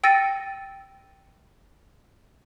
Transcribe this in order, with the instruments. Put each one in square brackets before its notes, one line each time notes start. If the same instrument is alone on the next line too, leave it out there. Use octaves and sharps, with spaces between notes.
[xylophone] G5 E6 A6 A#6 C#7 D#7